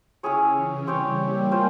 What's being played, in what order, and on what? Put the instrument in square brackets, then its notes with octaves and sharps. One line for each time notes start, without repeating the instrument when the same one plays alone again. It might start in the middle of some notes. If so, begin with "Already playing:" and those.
[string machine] C#3 [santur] C#4 E4 G#4 C#5
[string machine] E3
[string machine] G3 [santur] C4 G4 C#5
[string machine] A#3
[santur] C#4 F4 C5